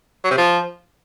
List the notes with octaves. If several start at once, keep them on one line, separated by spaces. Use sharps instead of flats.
F#3
C3
F3